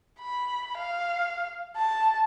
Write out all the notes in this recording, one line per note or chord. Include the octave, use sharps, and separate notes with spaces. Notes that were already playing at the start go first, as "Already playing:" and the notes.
B5
F5
A5